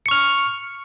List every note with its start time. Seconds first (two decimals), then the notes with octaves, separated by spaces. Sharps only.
0.06 C#7
0.09 C#6
0.11 F6